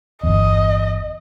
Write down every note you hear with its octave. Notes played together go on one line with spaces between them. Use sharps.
G1 E2 D#5